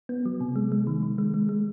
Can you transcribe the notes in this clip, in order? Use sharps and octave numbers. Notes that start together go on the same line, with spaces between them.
B3
F#3
C3
G#3
G#3
D#3
D#3
G#3
G#3
G#3